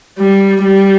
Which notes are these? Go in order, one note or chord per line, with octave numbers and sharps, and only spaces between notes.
G3
G3